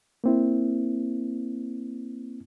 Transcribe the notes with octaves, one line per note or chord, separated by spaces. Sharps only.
A#3 C4 E4